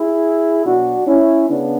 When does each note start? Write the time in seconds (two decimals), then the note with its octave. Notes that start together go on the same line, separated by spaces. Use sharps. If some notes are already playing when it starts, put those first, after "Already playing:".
Already playing: E4 G#4
0.66 B2 F#3 D4 F#4
1.07 C#4 E4
1.49 C#3 B3 D4